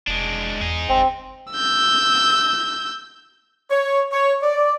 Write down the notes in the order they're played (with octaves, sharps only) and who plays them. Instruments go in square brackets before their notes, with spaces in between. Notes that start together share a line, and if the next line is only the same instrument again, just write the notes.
[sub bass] F1 [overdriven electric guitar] G#3 D4
[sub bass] E2 [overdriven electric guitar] D#4 G#4
[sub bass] G1 [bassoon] C4
[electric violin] E6 G6
[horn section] C#5
C#5
D5